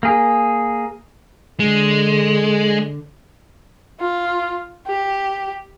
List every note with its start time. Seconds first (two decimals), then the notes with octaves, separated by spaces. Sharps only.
0.03 A#3 G#4
1.60 D3 G#3
4.00 F4
4.87 G4